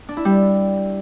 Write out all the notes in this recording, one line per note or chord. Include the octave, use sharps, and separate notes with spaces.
D4
E4
G3